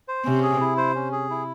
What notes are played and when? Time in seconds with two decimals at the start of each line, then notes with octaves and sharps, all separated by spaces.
0.08 C5
0.25 C3 C#4
0.43 G#4
0.61 E4
0.77 C5
0.95 C#4
1.12 G#4
1.30 E4